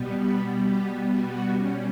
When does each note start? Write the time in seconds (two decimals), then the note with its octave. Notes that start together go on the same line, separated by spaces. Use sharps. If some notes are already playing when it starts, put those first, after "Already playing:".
Already playing: B2 G3 B3
0.20 B4
0.64 G4
1.09 F#4
1.53 B2 G3 C#4